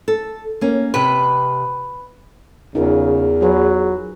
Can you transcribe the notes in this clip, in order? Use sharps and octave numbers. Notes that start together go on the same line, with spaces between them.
A4
A#3 C#4
C3 G4 B4 G5
E2 C#3 D#4 F4 A#4
F#3 G#4 B4